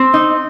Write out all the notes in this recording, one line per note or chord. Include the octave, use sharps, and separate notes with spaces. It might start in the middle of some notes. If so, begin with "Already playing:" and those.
Already playing: C4
D#4